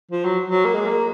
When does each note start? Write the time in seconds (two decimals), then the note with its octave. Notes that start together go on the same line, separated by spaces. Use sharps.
0.11 F3
0.25 F#3
0.49 F#3
0.65 A#3
0.74 G#3
0.86 A#3